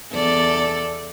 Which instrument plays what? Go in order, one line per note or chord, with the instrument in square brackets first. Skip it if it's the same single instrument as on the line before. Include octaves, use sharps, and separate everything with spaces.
[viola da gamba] E2 A4 D5